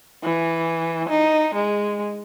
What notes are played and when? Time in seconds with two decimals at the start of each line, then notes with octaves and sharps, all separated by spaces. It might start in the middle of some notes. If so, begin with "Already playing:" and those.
0.23 E3
1.09 D#4
1.54 G#3